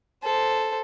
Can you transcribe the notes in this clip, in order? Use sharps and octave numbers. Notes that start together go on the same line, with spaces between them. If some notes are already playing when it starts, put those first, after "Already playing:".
A4 C5